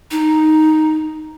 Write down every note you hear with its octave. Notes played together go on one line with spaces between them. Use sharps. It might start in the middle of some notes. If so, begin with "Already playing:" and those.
D#4